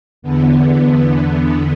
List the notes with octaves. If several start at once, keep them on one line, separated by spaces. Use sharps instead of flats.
E2 D3 B3